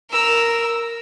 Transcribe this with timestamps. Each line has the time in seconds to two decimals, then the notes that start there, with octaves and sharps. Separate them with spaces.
0.10 A#4 E6